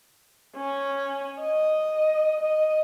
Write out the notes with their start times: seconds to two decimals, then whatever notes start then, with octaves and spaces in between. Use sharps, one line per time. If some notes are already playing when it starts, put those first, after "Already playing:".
0.56 C#4
1.40 D#5
2.40 D#5